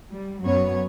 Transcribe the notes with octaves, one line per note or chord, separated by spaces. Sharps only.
G3
F#2 F#3 B3 C#5